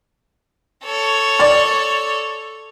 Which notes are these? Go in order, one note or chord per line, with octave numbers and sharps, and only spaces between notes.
A4 C#5
D5